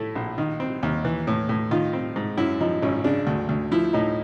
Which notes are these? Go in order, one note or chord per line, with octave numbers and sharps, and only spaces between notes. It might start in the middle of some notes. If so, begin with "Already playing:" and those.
Already playing: A2 A3 E4
A#1
D#3
C4
D#2
E3
A2
A2
D#3 F4
C4
G#2
F#2 E4
F3 D#4
G#1 C#4
C#3 D4
D2
D2
F3 E4
A2 D#4